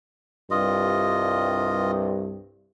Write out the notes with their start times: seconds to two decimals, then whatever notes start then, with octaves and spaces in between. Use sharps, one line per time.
0.51 C2 G2 F4 D#5